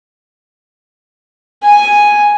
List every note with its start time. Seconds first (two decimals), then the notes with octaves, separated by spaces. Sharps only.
1.63 G#5